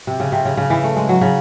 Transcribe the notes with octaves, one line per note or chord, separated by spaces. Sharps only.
C3
C#3
C3
C#3
C#3
E3
A3
G#3
F#3
C#3